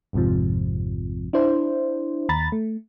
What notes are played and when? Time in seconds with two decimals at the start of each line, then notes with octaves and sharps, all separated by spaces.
0.13 G#1 F2 G#2 C3 F3
1.33 D4 E4 C5
2.29 D#2 A#5 B5 A6
2.52 A3